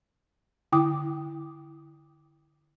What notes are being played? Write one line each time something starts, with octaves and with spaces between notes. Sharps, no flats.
D3 E4 G5 D6 D#6